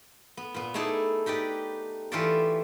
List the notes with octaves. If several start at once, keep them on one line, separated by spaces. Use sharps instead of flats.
B3
A#2 B3
A3 D#4 E4 G#4 A4 D5
D#4 G4 B4 D5
E3 F4 G4 A4 C#5 D5